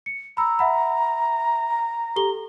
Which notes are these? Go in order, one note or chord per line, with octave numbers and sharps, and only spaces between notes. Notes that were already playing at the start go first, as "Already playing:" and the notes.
C#7
A#5 B5 E6
E5 F#5 B5
G4 A4 G7